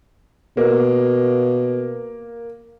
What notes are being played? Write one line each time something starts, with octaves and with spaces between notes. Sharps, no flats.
B2 A#3